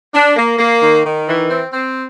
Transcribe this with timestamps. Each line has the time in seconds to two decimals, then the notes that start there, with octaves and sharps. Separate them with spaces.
0.15 D4
0.37 A#3
0.59 A#3
0.82 D#3
1.05 D#3
1.28 E3
1.51 C4
1.73 C4